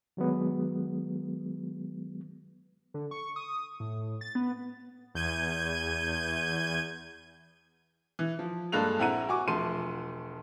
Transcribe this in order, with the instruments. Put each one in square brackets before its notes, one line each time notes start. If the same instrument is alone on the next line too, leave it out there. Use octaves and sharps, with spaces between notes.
[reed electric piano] D#3 F#3 G#3 B3
[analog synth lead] D3
C#6
D#6
A2
A6
B3
[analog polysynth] E2 G6 G#6 D#7
[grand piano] E3
F3
G2 G#3 A#3 A4 F#6 F7
A#1 C4 E4 F#5 A#5 D#7
F#4 G#5 C#6 D6
E1 F3 A3 C6 D#7